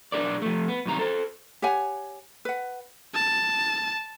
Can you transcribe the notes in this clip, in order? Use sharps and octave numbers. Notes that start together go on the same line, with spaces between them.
B1 D4 G#4 A#4 D5
F3 A3
B3
F#2 C3 D#3 A#5
A4 C5
G4 C#5 F#5 G#5
B4 F#5
A5